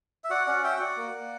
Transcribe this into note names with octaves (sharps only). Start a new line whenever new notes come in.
E5
F#4 D5 F#5
C#4 D5 F#5
F#4 E5 G5
G5
F#4 D5 F#5
A#3
A#3